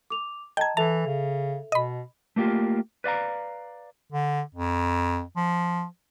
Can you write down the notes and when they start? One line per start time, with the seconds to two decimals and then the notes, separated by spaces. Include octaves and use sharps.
0.10 D6 F7
0.57 D#5 G5 A5 A#5 G#6
0.77 E3 A4 E5 A5 F7
1.06 C#3
1.72 B2 D#5 B5
2.36 A3 A#3 F4 G4
3.04 B4 D5 F5 A#5
4.12 D3
4.55 F2
5.36 F3